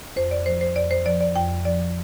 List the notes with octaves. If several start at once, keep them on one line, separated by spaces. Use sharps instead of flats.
F2 C5
D5
F3 C5
C5
F2 D5
C5
F3 D5
D5
F2 G5
F3 D5